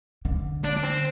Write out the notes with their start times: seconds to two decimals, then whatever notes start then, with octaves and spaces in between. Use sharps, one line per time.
0.25 D3
0.65 D4
0.77 D4
0.84 C4